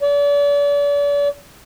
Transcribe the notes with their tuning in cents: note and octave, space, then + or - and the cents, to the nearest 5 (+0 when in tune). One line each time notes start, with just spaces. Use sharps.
D5 -40